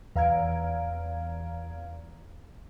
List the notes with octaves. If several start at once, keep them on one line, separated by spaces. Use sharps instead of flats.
E2 F5 A#5 F6 G#6 D7